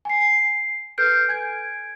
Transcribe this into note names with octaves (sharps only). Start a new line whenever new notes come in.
G#5 C7
C7
A4 B4 F6 G6 C7 D7
G#5 G#6 D7